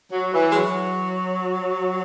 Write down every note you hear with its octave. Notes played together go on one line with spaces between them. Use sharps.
F#3
E3
G#3
F#3